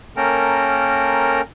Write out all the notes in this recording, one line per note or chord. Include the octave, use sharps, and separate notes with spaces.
A#3 C#4 A4 A#4 G5 A#5